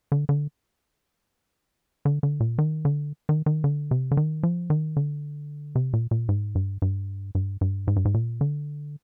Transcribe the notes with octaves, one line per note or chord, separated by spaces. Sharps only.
D3
D3
D3
D3
A#2
D#3
D3
D#3
D#3
D3
C3
D3
D#3
F3
D#3
D3
C3
A#2
A#2
G#2
G2
G2
G2
G2
G#2
G2
G#2
A#2
D3